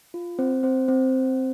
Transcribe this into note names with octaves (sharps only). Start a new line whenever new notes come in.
F4
C4 C5
C4 C5
C4 C5